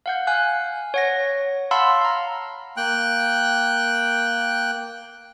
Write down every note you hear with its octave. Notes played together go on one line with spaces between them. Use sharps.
F5 F#5 G6
F5 G#5 F#6
C#5 F#5 A#6
F5 F#5 A5 B5 C6 E6
F5 A#5
A#3 G5 F#6